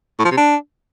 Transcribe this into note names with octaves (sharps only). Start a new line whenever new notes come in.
A2
F3
C3
D4